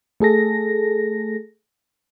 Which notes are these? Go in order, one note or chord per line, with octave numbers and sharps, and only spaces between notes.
A3 G#4 A4 A#6